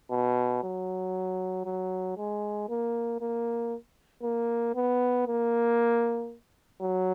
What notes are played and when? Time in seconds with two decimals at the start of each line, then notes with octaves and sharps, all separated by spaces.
0.11 B2
0.63 F#3
1.65 F#3
2.17 G#3
2.69 A#3
3.21 A#3
4.23 A#3
4.75 B3
5.27 A#3
6.81 F#3